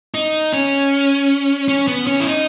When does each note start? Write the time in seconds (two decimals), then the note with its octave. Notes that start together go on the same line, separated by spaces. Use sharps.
0.14 D#4
0.54 C#4
1.69 C#4
1.88 B3
2.07 C#4
2.20 E4
2.27 D#4